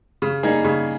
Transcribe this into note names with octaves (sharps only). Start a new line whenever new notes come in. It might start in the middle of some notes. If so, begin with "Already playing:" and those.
C#3
G3 A#3 D#4 G#4
C#3